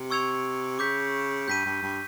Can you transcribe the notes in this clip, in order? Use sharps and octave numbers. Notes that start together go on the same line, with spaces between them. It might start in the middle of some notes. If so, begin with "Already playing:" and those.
Already playing: C3
C#6 E6 G#6 C#7 F7
C#3 D6 G6 B6
G2 G6 B6 D#7
G2
G2